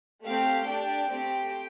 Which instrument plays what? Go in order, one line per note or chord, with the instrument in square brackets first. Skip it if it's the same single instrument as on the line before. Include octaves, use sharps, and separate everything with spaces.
[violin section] A3 C4 G4 F5
D4 G4 G5
A3 C4 G4